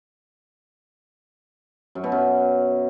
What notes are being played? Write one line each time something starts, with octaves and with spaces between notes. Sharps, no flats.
F#2
B2
F#2